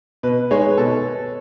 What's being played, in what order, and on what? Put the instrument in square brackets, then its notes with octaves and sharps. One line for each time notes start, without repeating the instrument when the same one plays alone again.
[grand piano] B2 [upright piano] B4
[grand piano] G#3 D#4 G#4 [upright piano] C#5
[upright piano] B4
[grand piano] B2 [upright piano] A4